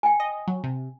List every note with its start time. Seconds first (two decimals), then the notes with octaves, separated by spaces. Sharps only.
0.03 G5 G#5
0.20 D#5
0.47 F#3
0.64 C3